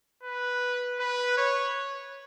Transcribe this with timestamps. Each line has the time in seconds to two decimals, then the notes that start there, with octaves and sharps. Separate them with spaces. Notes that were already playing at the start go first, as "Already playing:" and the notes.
0.23 B4
1.00 B4
1.38 C#5